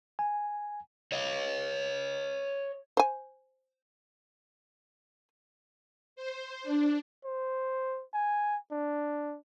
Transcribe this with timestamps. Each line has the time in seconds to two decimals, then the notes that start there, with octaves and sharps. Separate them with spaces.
0.19 G#5
1.12 C#5 D#5
2.97 C5 G#5
6.16 C5
6.64 D4
7.25 C5
8.14 G#5
8.71 D4